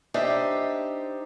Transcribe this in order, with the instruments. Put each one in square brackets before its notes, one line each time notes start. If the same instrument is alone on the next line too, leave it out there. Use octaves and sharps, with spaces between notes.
[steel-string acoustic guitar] D4 D#4 G4 C5 E5